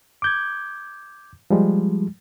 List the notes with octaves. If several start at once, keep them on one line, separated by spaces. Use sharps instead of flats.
D6 G6 G#6
F3 G3 G#3